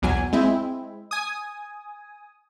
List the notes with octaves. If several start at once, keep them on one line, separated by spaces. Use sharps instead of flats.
B1 E2 F#3 G#5
G#3 C4 E4
G#5 D#6